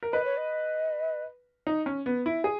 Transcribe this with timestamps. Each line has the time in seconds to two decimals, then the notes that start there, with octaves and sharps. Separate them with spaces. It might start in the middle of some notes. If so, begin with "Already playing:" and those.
0.03 A#4
0.13 B4 D#5
0.25 C#5
0.37 D#5
1.67 D#4
1.86 C#4
2.06 B3
2.26 E4
2.44 G#4